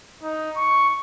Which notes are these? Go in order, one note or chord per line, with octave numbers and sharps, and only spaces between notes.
D#4
C#6